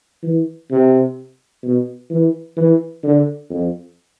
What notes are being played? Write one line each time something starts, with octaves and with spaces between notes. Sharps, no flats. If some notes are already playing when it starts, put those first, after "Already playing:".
E3
C3
B2
E3
E3
D3
F2